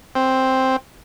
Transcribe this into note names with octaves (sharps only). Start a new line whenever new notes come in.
C4